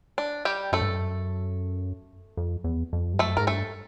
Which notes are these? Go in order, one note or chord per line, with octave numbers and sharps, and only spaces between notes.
D4
G3 G4
F#2 A3 A4
G2
F#2
F2
E2
F2
G2
F#2 A3 A4
G#2 A#4
G2 A3 A4